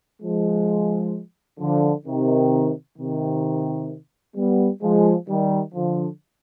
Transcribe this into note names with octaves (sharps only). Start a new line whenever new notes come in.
F3 G#3
D3 F3
C3 D#3
C3 D#3
G3 B3
F3 G#3
D#3 G3
D3 F3